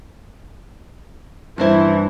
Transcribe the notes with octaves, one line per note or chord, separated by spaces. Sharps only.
G2 E3 F3 C4 E4 C5